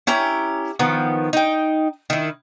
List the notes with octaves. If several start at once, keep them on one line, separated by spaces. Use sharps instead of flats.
C#4 E4 G4 A#5
D#3 F3 B3
D#4 G5
D#3 E4